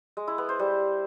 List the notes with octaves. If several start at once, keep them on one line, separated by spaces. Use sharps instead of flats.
G#3
E4
B3
C5
G3